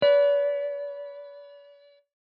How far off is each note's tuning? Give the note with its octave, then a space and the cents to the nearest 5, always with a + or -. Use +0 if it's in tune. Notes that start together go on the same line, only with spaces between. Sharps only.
B4 +0 D5 -45